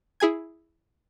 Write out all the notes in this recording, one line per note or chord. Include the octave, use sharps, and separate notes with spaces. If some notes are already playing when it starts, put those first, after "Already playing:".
E4 G#4 G#5 G#6